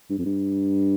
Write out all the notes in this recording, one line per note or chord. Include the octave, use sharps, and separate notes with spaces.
G2
F2
G2